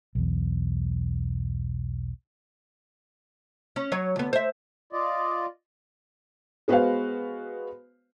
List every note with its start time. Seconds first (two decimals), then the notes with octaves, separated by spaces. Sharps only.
0.15 B1 E2
3.76 C#4
3.92 F#3 C#5
4.16 D2 B3
4.33 C5 E5
4.93 F4 D5 D#5
6.68 G#3 B3 F#4 B4 C5 F5